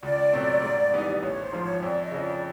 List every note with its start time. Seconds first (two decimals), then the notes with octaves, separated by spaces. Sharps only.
0.03 C#2 D5
0.33 B2 F#3 A3 C4
0.63 G#2
0.92 E3 G3 B3 D#4
1.23 A1 C#5
1.42 C5
1.53 G#2 F3
1.62 C#5
1.82 F2 D5
2.02 D#5
2.11 C#3 F3
2.22 D5